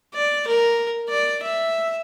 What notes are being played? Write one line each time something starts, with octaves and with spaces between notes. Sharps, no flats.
D5
A#4
D5
E5